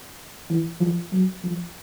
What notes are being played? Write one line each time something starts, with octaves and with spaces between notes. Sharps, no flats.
E3
F3
F#3
F3